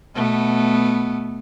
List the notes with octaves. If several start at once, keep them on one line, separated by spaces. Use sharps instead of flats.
B2 A3 B3